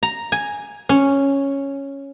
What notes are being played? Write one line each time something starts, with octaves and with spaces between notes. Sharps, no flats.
A#5
G#5
C#4